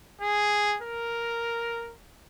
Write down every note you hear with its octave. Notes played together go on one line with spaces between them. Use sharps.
G#4
A#4